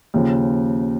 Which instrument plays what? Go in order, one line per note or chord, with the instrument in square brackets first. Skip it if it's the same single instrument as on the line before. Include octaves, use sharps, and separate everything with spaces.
[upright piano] D#2 C#3 F3